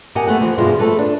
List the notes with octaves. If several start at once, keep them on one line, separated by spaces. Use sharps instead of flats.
G4 A#4 D#5 F#5 G#5
A3 B3 F#5
E3 F3
G2 B2 D3 G#3 E4 F4
F3 A3 B3 A4 B4
D4